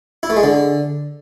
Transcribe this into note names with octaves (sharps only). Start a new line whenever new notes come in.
E4
A3
G#3
D3